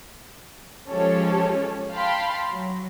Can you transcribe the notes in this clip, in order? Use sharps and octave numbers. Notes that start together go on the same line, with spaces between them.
F3 G#3 C#4 G4 A4 C#5
F5 G5 A5 B5 C6
F#3